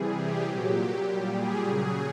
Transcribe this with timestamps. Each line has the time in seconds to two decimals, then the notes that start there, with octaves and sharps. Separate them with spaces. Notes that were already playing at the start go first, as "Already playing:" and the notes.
Already playing: C3 E3 G3 G#4
0.14 G4
0.44 A#2 F#3
1.04 A#2 G3
1.34 G#4
1.65 C#3 F#3